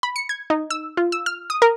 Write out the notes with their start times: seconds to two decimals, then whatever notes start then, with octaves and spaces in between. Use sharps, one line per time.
0.03 B5
0.16 C#7
0.29 G#6
0.50 D#4
0.70 E6
0.97 F4
1.12 E6
1.26 F6
1.50 D#6
1.62 A#4